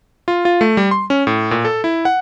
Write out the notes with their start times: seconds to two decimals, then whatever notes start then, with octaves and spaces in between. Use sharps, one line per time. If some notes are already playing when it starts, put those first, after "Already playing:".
0.28 F4
0.45 F4
0.61 A3
0.77 G3
0.91 C6
1.10 C#4
1.27 A2
1.51 A#2
1.65 A4
1.84 E4
2.05 F#5